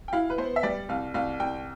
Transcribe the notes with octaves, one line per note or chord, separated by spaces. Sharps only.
G5
E4 F5
B4
B3 C5
E5
G3 D5
C2 F5
C2 F5
C2 G5